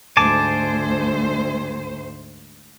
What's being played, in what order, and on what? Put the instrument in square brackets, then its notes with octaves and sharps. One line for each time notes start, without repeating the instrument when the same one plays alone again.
[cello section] D2 G#2 C5 [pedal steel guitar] G#5 A5 D6